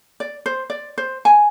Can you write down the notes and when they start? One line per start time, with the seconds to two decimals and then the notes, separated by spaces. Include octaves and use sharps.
0.20 D5
0.46 C5
0.70 D5
0.98 C5
1.25 G#5